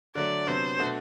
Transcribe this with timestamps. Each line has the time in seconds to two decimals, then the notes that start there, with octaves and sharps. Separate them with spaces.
0.15 D3 F#3 A3 D5
0.47 C3 F#3 B3 D4 C5
0.79 B2 A3 D4 F#4